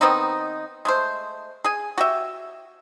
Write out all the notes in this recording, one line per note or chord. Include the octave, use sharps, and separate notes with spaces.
D#3 B3 C4 D#4
G#3 A3 C5
G#4 G#5
F#4 G4 E5